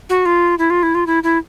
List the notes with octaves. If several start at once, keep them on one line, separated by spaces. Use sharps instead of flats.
F#4
F4
E4
F4
E4
F4
E4
E4